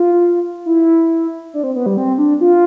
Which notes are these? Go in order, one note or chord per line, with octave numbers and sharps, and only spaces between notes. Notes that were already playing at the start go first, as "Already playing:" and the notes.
Already playing: F4
E4
D4
C4
B3
G3
C4
D4
F4